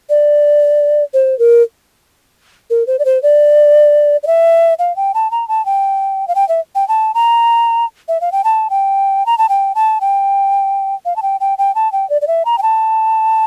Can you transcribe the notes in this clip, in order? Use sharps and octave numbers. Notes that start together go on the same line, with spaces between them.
D5
C5
A#4
A#4
C5
D5
C5
D5
D5
E5
F5
G5
A5
A#5
A5
G5
F5
G5
E5
G5
A5
A#5
E5
F5
G5
A5
G5
A#5
A5
G5
A5
G5
F5
A5
G5
G5
G5
A5
G5
D5
D5
E5
A#5
G5
A5